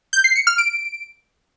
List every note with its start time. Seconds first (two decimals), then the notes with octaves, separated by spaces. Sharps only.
0.13 G6
0.24 C7
0.36 C#7
0.47 F6
0.58 D7